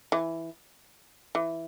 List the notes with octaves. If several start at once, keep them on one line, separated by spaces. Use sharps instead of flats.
E3
E3